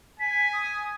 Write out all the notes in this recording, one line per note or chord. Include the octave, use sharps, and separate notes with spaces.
G#5 B6
D#6